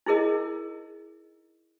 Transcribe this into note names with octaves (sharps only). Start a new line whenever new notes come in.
D#4 E4 G#4 A#4 D#5